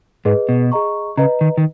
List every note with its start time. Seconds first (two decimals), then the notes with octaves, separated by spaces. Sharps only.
0.25 G#2 G#4 B4 D#5
0.49 B2
0.72 G#4 D#5 A#5 C#6
1.17 C#3 B4 D#5 A#5
1.41 D#3
1.57 D#3